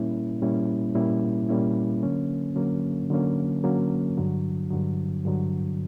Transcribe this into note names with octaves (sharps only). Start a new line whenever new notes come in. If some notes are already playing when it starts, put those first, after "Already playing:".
Already playing: A#2 G3 A#3 C#4 E4
A#2 G3 A#3 C#4 E4
A#2 G3 A#3 C#4 E4
A#2 G3 A#3 C#4 E4
D3 F#3 A#3 C#4
D3 F#3 A#3 C#4
D3 F#3 A#3 C#4
D3 F#3 A#3 C#4
G2 D3 F#3
G2 D3 F#3
G2 D3 F#3